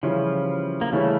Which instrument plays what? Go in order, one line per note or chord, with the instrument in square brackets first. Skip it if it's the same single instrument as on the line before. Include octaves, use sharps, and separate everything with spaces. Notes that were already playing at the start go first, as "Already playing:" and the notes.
[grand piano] C#3 E3 G3 C#4 E4 [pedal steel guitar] F3
[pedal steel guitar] A#3
[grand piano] C#3 E3 G3 C#4 E4 [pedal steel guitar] A3